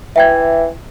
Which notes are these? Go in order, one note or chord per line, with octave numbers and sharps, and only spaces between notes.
E3 E5 G5 G#6